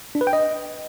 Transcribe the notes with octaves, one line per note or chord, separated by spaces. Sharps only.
D4
B4
G5
D#5